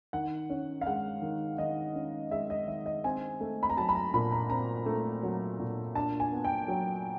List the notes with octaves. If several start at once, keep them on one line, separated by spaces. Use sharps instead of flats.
D#3 F#5
C#4
F5
G#3 F#5
D#3
D#3 D#5
C#4
G#3 E5
D#5
D#3 E5
D#5
C4 G#5
A3
B5
A#5
F#3 A5
B5
A#5
A#2 B5
A#5
C4 A#5
A3
F#3
A#2
D4 A5
G#5
B3
G5
F#3